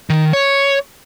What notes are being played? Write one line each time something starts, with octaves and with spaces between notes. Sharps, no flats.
D#3
C#5